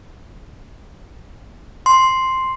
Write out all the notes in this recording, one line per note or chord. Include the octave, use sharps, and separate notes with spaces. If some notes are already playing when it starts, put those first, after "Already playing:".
C6